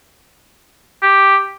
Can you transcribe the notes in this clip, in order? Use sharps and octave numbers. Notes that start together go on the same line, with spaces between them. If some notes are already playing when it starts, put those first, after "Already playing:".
G4